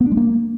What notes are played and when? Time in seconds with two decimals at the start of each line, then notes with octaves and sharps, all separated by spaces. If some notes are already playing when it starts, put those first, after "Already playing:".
0.01 B3
0.06 D4
0.12 G#3
0.17 A#3